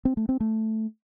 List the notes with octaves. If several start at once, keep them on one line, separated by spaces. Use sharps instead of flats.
C4
A3
C4
A3